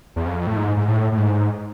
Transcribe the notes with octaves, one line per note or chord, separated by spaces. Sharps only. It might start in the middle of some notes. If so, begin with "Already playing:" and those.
E2
F2
A2
G#2
G#2
A2
A2
G#2